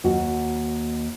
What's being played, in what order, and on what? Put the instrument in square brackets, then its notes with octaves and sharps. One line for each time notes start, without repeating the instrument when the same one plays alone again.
[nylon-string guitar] D#2 F#4